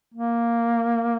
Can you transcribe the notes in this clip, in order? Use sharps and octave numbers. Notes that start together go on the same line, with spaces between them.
A#3